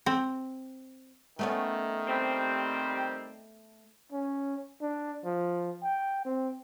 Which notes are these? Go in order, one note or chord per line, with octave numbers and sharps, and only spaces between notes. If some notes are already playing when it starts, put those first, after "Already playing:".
C4
D#3 A3 B3 C#4
G3 C4
C#4
D4
F3
G5
C4